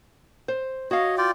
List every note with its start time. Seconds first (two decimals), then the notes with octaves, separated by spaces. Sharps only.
0.48 C5
0.91 F#4 C#5 D#5 F5
1.18 F4 D5 G5